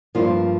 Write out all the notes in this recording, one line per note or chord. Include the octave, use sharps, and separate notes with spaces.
G2 F3 A#3 F4